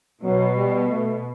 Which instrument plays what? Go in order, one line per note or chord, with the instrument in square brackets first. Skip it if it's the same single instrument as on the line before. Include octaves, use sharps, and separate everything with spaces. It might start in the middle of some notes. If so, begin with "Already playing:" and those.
[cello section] B2 [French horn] F#3
[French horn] G3
A3